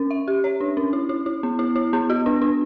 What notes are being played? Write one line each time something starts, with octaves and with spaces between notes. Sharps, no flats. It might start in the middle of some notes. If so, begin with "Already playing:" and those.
Already playing: C#4
E5
G4
C#5
D4
C#4
E4
E4
E4
B3
E4
E4
B3
F#4
D4
D4